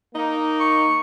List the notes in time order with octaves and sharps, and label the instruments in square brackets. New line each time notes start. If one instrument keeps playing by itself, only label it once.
[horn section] A#3 D#4
[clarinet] C#6